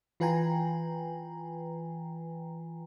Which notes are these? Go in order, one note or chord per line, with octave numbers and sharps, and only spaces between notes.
E3 F4 B4 G5 G#5 A#5